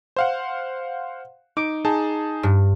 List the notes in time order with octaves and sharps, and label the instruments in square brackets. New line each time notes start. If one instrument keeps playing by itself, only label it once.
[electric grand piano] C5 F5 F#5
[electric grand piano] D#4 [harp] D6
[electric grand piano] D#4 G#4 A5
[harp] G2